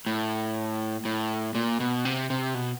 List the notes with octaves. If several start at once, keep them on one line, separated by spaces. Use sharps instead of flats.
A2
A2
A#2
B2
C3
C3
B2